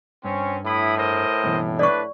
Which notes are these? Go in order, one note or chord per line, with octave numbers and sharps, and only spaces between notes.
G2 C4 C#4
A2 E4 B5 D#6
A#4 C5 D#5
G2 B2 E3
D4 B4 D5 C#6